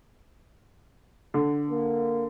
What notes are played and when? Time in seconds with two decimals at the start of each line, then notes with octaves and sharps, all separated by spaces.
1.34 D3
1.70 A#3